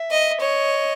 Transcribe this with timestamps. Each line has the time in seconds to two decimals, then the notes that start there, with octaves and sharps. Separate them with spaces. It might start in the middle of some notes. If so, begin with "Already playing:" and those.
Already playing: E5
0.11 D#5
0.40 C#5 D#5